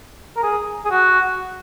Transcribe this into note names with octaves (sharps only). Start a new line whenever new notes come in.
A#4
G#4
G#4
F#4